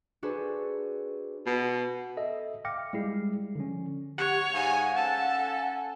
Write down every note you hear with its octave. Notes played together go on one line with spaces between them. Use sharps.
D4 F#4 G#4 A4 B4 C5
B2
A4 D#5 E5
F5 G5 D6 F6 A#6 C#7
G3 G#3 E4 G#4 C7
D3 F3 C#4
G4 C#5 F#5
G#2 F5 G#5
C#4 A4 A5